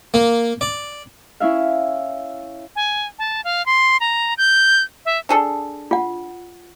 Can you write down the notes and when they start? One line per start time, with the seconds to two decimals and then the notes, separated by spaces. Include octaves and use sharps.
0.14 A#3
0.61 D5
1.40 C#4 E4 E5 F5
2.76 G#5
3.19 A5
3.44 F5
3.66 C6
4.00 A#5
4.38 G6
5.05 E5
5.29 D4 G#4 A4
5.91 F4 F#5